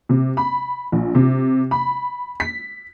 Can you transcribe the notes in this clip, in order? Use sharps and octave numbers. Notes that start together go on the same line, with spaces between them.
C3
B5
A#1
C3
B5
B6